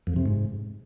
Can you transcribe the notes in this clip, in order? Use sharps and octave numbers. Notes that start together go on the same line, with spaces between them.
F2
C3
G#2